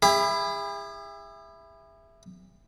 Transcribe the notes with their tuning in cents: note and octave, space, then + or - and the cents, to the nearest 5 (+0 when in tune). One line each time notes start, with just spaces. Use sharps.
E4 +5 G#4 -45